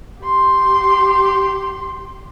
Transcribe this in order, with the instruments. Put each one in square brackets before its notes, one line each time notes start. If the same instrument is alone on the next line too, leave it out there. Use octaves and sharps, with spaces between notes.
[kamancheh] G4 C6